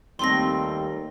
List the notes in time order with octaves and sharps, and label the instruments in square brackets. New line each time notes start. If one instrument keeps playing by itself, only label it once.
[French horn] D#2 [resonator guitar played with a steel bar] G3 A3 C4 [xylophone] C6 A#6